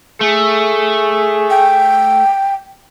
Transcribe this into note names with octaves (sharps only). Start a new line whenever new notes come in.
A3 G#4
G5